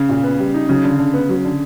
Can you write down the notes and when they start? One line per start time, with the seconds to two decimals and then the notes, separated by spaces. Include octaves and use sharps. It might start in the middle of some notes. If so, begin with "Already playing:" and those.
Already playing: C#3
0.09 A#2
0.23 B3
0.39 G3
0.54 D#4
0.69 C#3 F#3
0.84 D3
0.99 D3
1.14 B3
1.29 F#3
1.44 D3